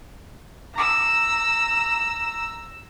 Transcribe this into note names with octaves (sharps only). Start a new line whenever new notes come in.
A#5 E6